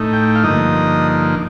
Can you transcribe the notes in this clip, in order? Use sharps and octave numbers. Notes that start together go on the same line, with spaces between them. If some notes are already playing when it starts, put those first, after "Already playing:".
Already playing: A2 A3 D#4
G5
F5
G2 D3 F3 A#3 D#4 D#5